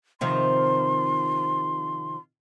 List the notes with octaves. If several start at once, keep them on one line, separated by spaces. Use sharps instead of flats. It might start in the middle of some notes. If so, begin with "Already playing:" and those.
C3 D#3 F3 C6